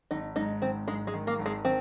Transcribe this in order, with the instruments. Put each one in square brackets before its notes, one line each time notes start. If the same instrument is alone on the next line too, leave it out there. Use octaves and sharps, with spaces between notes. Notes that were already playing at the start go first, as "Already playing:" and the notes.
[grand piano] G#1 [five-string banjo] D#4
[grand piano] G#2 [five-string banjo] D#4
[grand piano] G#1 [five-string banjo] C4
[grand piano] G#2 [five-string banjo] G#3
[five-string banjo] G#3
[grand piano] D#3
[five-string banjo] A#3
[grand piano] G#1
[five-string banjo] G#3
[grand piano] D#3 [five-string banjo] C4